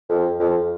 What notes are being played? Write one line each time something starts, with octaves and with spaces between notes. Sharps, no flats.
F2
F2